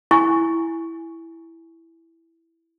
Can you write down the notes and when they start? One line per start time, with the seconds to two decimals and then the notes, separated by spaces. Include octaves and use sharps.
0.11 E4 G#5 C#6